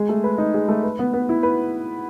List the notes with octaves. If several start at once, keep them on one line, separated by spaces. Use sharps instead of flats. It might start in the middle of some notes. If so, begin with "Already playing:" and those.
Already playing: G#3 G#4
A3
B4
D#4
G#4
A3
B4
B3
B3
E4
B4